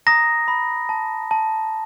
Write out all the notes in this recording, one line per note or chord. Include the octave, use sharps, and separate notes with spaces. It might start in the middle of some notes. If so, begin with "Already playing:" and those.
A#5 D#6 A#6
B5
A5
A5